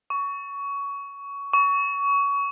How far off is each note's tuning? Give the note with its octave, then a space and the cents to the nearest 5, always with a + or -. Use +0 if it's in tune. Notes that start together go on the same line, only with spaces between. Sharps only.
C#6 +20
C#6 +25